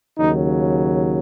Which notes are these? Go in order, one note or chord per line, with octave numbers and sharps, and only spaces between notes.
D#2 C#3 F#3 D#4